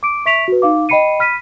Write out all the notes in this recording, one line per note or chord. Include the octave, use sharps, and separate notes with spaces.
D6 D7
E5 C#6 B6 D7 F7
F#4 B4
D#4 F5 D6
D#5 G5 B5 C7 C#7 D#7
B5 F6 B6 D#7